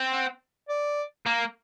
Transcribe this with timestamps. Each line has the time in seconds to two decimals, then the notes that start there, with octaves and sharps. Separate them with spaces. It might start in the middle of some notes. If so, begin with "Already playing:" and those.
Already playing: C4
0.10 F#5
0.69 D5
1.26 A#3